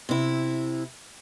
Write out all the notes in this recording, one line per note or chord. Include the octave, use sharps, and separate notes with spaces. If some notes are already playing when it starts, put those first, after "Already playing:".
C3 E4